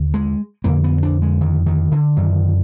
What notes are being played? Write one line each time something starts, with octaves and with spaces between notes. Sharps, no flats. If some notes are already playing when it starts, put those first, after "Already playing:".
Already playing: D#2 D3
G#3
F2 D3 A#3
B3
D4
G#3
D#3
D#3
D3
F#2 D3 D#3